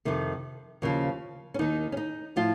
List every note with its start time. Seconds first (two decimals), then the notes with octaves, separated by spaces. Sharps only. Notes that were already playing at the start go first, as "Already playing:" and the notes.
0.05 F2 C3 D#3
0.82 D#2 C#3 F3
1.54 C#4
1.59 D#2 D#3 D#4
1.92 C#4
1.97 D#4
2.36 A2 F3 F4